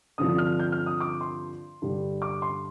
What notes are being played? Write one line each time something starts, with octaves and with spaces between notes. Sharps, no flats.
G2 D3 F3 C4 D#6
F6
G6
F6
D#6
D6
C6
G2 D3 G3
D6
C6